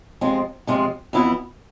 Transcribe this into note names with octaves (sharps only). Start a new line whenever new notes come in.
C3 F3 G#3 C4
C3 F3 G#3 C4
F2 E3 B3 E4